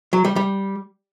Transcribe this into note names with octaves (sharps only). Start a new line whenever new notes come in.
F#3
G3
G3